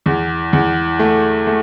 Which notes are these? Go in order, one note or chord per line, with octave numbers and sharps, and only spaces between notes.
E2
E2
A3
A3